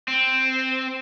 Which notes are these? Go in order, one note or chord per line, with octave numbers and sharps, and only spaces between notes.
C4